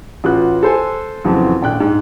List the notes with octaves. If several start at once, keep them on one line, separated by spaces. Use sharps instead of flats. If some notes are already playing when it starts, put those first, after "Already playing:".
A1 F4 F#4 B4 F#6
A4 C5 G#5
F2 A2 C#3 E3 F#3 C4
D#1 A#1 G5 F#6
G#2